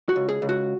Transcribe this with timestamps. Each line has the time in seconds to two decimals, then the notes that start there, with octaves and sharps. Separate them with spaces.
0.09 F#4
0.16 C#2
0.29 G#4
0.42 C#2
0.49 F#4